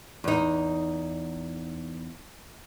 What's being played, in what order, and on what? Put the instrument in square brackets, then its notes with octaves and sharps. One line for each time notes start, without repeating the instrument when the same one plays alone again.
[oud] E2 D#4